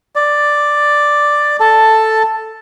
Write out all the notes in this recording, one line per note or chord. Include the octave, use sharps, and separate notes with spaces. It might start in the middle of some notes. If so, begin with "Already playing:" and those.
D5
A4 A5